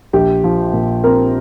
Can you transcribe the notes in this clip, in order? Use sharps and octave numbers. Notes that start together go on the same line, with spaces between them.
A#1 G4
F3
A#2
C4 A#4